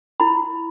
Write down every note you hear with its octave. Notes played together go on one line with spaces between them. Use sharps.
E4 B5